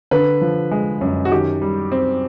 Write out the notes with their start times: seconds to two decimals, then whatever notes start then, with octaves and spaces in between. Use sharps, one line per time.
0.11 D3 B4
0.42 F3
0.71 G#3
1.01 F#2
1.25 F#4
1.31 D#3 G4
1.62 G3
1.92 C4